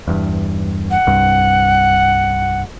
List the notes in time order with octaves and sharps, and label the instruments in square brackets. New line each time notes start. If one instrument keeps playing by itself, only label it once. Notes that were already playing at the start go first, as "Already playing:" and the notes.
[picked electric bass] E2 G2
[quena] F#5
[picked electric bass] C2 G2